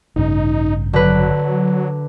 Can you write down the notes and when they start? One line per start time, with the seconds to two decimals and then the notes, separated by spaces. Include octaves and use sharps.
0.16 A1 G2 C#3 D#4
0.93 D3 F#3 B4